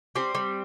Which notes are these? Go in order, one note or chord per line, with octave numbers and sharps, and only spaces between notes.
G3 C4
G3